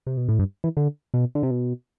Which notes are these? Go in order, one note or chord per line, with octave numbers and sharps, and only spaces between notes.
C3
B2
A2
G2
E3
D3
B2
D3
C3
B2